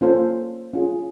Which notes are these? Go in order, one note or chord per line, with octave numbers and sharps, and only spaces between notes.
A#3 C#4 F4 A4 C5
C#4 F4 G#4